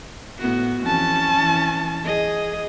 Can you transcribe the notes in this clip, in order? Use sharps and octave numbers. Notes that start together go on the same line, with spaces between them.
A2 B3 F#4
F2 E3 C#4 A5
E3
G#4 D#5